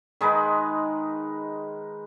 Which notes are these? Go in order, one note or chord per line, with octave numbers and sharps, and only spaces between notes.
D#3 G#3 D#4 B4